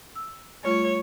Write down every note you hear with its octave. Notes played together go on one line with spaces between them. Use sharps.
E6
G3 A3 F4 C#5